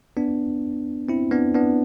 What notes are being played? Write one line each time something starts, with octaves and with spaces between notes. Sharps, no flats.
B3 D4
C4 E4
B3 D4
B3 D4